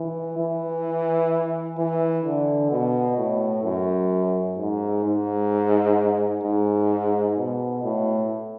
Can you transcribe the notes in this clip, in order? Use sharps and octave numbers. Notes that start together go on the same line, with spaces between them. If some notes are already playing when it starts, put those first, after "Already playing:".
Already playing: E3
E3
E3
D3
B2
A2
F#2
G#2
G#2
G#2
B2
A2